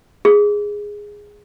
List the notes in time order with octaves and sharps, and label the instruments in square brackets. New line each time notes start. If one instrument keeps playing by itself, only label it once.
[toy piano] G#4